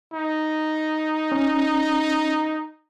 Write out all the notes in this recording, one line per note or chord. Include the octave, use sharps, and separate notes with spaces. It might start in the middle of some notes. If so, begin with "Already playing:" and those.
D#4
C#4